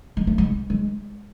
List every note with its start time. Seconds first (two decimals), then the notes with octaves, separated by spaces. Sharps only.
0.17 G#3
0.27 A3
0.38 G#3
0.70 G#3